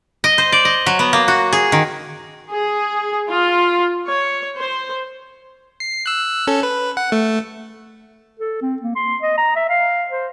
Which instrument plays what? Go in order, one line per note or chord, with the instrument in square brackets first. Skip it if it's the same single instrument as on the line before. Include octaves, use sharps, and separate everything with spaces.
[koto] D#5
C5
D5
D#5
F#3
B3
A#3
F#4
G#4
D#3
[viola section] G#4
F4
C#5
C5
[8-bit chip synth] C7
E6 F#6
C#4 A4
B4
F#5
A3
[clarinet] A4
C4
A#3
C6
D#5
A#5
E5
F5
C5